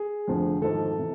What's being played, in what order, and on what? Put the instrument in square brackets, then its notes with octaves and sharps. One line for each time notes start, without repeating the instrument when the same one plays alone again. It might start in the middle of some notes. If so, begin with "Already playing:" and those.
Already playing: [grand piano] G#4
F1 F2 D3 F3
G#1 G#2 F3 A4
C3 E3